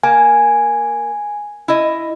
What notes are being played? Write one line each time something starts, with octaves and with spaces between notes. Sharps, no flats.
A#3 G#5
E4 D#5